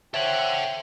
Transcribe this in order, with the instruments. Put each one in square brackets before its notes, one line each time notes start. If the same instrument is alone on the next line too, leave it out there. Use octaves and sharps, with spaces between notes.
[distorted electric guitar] A4 F#5 [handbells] C5 C#5 E5 [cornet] G5